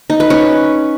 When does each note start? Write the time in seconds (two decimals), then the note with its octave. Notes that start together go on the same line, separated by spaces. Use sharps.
0.10 D#4
0.20 B4
0.30 C#4